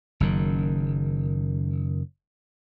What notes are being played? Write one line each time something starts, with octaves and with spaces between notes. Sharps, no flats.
F#1 F#2 D#3